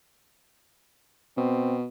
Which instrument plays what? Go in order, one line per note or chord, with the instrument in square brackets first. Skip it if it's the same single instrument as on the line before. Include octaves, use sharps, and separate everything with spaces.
[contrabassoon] B2 [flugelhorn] C4